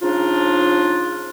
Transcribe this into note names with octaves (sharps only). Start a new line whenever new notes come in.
C#3 F3 D4 D#4 F4